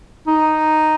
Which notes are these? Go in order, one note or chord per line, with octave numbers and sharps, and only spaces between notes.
D#4